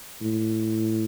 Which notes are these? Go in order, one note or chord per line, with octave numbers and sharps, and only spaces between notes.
A2